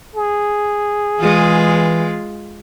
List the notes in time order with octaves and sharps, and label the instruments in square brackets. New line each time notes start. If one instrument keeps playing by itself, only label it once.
[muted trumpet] G#4
[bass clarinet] E3 [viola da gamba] G#3 F4